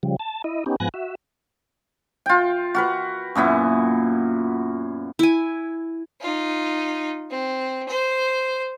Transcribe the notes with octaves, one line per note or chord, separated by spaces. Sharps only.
C#3 F3 G3
A5
E4 D#5
B3 C#4 D#4 G4
G#2 F3 B3 G#5 F#6 A#6
F#4 E5
F4 G5
F#4 A#4 B4
F#2 A#2 B3 E4
E4 G#5
D#4 F4
C4
C5